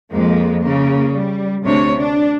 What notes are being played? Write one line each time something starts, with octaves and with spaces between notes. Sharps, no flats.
F2 G#3 A#3
C#3 A#3
G3
D2 C3 D4 C#5
D4